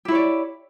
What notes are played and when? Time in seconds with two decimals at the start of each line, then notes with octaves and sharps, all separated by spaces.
0.05 G4
0.08 E4
0.12 C#5
0.15 D5